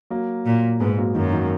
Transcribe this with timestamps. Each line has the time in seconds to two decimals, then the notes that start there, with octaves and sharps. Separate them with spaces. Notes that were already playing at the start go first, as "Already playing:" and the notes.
0.10 F#3 A#3
0.46 A#2
0.80 G#2 G#3 B3
0.98 F#3 A#3
1.15 F#2 D#3 F#3
1.33 D#3 F#3